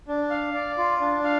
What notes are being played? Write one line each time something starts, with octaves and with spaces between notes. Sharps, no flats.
D4
F5
D5
F4
D4
F5